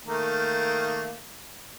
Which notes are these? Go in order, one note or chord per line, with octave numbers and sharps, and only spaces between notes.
D#3 A3 A#3